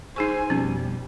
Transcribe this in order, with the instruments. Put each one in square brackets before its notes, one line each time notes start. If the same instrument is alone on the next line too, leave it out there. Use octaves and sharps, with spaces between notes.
[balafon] D#4 G#4 C#6 [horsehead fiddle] C5 G#5
[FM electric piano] F2 B2 [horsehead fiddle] G3 [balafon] C#4